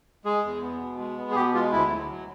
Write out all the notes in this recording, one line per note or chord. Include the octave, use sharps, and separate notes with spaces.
G#3 G#4
E2
B3
B2
G#3
B3
G#4
B2 G4
G#3 F4
D2 E4
F#3
F#3